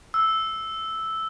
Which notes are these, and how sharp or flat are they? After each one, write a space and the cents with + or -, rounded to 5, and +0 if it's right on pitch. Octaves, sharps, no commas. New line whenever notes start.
E6 -5